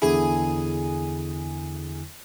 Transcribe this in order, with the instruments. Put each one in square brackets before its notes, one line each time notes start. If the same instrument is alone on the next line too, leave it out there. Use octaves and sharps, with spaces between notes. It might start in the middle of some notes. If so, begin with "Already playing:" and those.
[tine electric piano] E2 D3 E4 [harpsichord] G#4